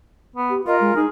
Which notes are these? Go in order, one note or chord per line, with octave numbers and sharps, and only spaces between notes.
B3
G4
F4 A#4 D#5
G#3
D#4 G#4